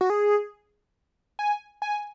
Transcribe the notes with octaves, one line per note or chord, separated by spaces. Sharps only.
F#4
G#4
G#5
G#5